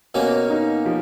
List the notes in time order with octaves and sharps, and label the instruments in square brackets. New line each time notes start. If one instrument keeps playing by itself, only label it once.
[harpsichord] B2 A#3 C#4 [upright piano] F#4
[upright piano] D#4
F3